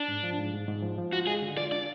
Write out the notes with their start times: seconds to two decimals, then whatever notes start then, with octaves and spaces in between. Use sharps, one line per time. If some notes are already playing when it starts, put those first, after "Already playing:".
Already playing: D4
0.08 G#2
0.23 F3
0.38 G#2
0.53 G#2
0.68 G#2
0.83 F3
0.98 F3
1.13 F4 F#4
1.27 G#3 G#4
1.42 D3
1.57 F4 D5
1.72 D4 D5